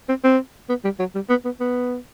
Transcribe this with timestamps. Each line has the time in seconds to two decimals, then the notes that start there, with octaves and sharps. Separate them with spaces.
0.09 C4
0.24 C4
0.69 B3
0.84 G3
0.99 F#3
1.15 G3
1.29 B3
1.45 B3
1.60 B3